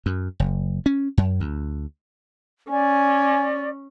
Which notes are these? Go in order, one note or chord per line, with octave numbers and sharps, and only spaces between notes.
F#2
F#1
C#4
F#2
D2
C#4 D5 G#5